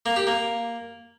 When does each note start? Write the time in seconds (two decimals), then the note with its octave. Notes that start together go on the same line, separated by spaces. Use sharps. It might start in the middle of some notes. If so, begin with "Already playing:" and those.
0.06 A#3
0.16 G4
0.27 A#3